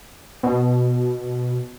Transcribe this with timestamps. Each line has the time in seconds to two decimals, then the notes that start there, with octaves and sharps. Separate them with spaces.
0.43 B2